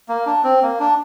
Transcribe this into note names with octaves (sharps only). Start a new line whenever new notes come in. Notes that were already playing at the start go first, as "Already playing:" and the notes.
A#3
D4
C4
A#3
D4